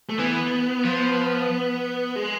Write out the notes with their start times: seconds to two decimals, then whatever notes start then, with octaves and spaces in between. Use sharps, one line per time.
0.09 A3
0.19 E3 B3
0.85 F3
2.16 G#3